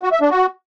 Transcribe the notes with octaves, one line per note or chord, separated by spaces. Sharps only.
F#4
E5
D4
F#4